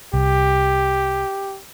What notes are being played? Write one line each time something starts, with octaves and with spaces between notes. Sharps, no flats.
C2 G4